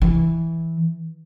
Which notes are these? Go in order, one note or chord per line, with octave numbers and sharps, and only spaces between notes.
E3